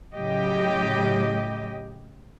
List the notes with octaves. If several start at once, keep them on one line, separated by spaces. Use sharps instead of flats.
A2 C#3 F#3 G4 D#5